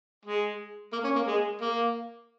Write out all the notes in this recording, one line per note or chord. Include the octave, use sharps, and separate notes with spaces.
G#3
A#3
C#4
A#3
G#3
A#3